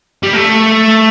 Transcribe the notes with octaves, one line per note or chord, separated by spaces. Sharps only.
G3
A3